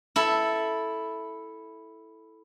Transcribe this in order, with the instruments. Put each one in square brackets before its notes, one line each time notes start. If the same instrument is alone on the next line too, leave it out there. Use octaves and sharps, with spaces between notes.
[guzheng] E4 A4